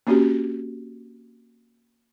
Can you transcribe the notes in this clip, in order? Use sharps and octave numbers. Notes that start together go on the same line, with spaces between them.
A#3 C4 C#4 F#4 G4